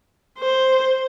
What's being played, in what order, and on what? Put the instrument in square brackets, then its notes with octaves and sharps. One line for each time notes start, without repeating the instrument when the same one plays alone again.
[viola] C5